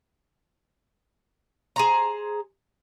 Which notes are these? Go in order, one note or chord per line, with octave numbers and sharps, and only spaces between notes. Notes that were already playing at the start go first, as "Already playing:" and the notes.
G#4 C5 A#5